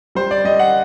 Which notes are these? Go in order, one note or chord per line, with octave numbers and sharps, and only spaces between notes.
G3 C5
D5
G3 D#5
F#5